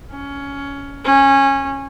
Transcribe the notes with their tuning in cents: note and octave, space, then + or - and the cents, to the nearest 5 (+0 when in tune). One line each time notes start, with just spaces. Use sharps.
C#4 +15
C#4 -20